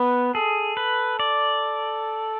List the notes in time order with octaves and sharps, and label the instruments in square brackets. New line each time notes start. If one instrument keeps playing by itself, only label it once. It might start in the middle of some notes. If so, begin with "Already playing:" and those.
Already playing: [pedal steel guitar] B3 [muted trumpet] B4
[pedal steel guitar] G#4 [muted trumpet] A4
[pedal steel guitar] B4
D5